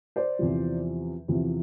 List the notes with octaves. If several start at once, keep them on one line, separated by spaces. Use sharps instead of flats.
C5 D5
E2 C3 F3
E2 C3 F3